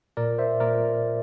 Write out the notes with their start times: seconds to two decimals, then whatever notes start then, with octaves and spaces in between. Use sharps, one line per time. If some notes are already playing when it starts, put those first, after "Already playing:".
0.17 A#2 A#4 D5
0.38 C5 E5
0.60 A#2 A#4 D5